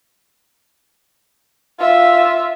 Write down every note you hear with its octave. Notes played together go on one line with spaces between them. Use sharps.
F4 E5